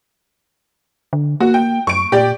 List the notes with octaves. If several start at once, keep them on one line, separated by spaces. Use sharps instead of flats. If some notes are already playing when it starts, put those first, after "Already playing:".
D3
A#3 F#4
G5
F#2 C#6 D7
A#2 G4 D5